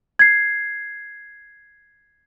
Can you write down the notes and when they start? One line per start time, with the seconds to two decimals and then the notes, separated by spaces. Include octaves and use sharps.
0.19 G#6 C7